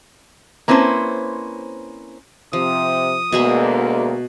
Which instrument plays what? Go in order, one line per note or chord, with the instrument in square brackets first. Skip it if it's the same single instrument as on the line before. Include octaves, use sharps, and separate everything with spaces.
[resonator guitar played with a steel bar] A#3 C4 C#4 E4 B4 C5
[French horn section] C3 [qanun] F3 [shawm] D#6
[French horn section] D2 G#3 A#3 [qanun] B2 G#4 E5